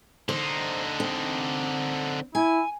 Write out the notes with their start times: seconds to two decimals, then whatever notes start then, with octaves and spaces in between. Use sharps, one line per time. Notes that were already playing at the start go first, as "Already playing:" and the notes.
0.29 D3 D#4 C5
1.00 C4
2.35 E4 G#5